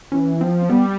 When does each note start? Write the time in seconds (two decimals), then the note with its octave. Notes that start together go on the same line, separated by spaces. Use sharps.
0.12 E3 C#4
0.41 F3 C4
0.69 G3 B3